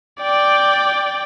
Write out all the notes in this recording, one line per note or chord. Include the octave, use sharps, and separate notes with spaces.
D5 G5